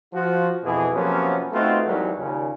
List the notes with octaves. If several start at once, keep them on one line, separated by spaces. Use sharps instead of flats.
F3 F4 F#4
F2 B2 E3 G#4
C3 F3 F#3 A#3 B3 C#4
A3 B3 C4 D#4 F4 F#4
G#1 D#2 G#2 E3 F#3 G3
D#2 A#2 C#3